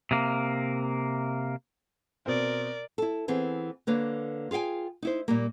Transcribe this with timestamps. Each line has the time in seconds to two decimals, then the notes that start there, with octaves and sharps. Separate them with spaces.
0.11 C3 A#3
2.26 B2 C4 A#4 D5
2.98 E4 A4
3.28 E3 B3 C4 G#4
3.87 D3 A#3 B4 C#5
4.51 F4 G#4 F5 G5 G#5
5.02 D#4 E4 C5
5.28 A#2 G3 A#3